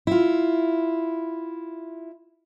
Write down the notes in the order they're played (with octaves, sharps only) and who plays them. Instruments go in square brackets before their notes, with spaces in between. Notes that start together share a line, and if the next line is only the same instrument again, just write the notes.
[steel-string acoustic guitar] E4 F4